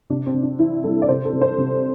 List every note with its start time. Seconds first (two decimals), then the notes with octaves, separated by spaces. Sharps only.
0.10 C3 D4
0.26 C4
0.34 C3
0.43 D4
0.59 E3 E4
0.84 G3 A4
1.02 D5
1.09 C3 C5
1.25 A4
1.33 C3
1.41 C5
1.58 C3